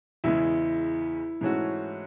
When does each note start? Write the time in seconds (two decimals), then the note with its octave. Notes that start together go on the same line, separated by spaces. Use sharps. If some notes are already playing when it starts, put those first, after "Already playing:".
0.24 E2 C#3 G#3 E4
1.41 G#2 E3 A3 C#4 F#4